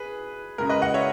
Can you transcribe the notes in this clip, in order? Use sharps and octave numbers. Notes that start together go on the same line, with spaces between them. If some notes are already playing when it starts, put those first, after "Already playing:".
Already playing: G#4 B4
C#3 G#3 A#4
B4 D#5
D#5 F#5
C#5 E5